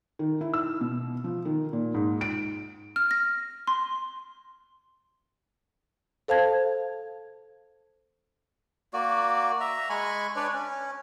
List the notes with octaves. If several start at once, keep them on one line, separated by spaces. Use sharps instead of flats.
D#3
E4
E6
B2
F3
D#3
A#2
G#2
D7
F6
A#6
C6
A4 C5 F5 A5 G#6
A#3 F#4 D5
E5 A#5
G#3 G#5 B5 C#6
D4 B4 C#5 D5
C#4